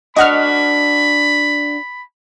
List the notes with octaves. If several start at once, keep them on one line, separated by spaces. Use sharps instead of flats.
D4 F#4 D#5 F#5 B5 F6